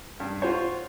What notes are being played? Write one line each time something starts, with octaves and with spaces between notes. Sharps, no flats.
G2
F4 F#4 C5 C#5